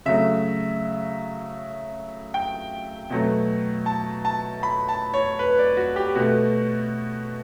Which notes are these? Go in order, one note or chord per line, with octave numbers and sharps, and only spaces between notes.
C#3 F#3 A3 E5
G5
B2 F#3 A3
A5
A5
B5
A5
C#5
B4
D5
F#4
G4
B2 A3 F#4